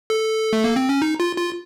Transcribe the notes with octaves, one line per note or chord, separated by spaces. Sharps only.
A4
A3
A#3
C4
C#4
D#4
F4
F4